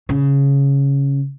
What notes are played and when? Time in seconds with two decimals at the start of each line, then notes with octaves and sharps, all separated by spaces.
0.09 C#3